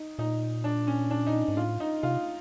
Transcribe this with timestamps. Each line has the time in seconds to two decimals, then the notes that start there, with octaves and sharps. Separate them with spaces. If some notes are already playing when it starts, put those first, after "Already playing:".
Already playing: D#4
0.19 A#2 D#4
0.64 D4
0.87 C#4
1.11 D4
1.27 D#4
1.48 G#2
1.57 A2 F4
1.80 D#4
2.03 C3 F4